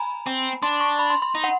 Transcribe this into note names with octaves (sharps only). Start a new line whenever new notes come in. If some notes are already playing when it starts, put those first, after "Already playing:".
Already playing: G#5 A#5 B5
C4
D4 C6
C#6
B5
C6
C6
D#4
F#5